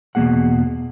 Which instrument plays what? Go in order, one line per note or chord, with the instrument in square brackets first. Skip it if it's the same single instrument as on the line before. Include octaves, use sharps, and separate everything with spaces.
[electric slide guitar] E2 B2 G3 A#3 G#4 F#5